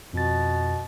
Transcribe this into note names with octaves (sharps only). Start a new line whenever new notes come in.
F2 B2 A6